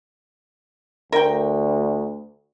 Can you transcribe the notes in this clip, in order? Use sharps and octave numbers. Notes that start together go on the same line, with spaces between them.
D2 A#4 G5